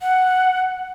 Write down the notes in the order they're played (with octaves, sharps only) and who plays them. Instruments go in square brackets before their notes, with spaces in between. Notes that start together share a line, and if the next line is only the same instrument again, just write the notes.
[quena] F#5